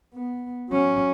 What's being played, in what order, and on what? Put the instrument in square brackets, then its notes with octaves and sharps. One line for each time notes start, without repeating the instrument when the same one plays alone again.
[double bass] B3
F#3 C#4